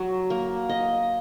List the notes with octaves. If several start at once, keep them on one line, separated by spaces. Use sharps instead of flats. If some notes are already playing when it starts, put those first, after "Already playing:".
Already playing: F#3
A#3
D#5